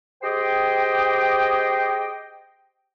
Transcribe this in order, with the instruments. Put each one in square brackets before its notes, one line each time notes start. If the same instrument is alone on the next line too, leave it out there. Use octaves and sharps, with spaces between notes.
[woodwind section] G4 G#4 C5 D#5 G5